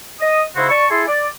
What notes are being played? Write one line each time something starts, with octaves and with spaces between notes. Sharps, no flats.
D#5 D#6
G#2 C#3 E4 F#4 C5
D5 A5 C#6
E4 G#4 A4 G#5 C6
D5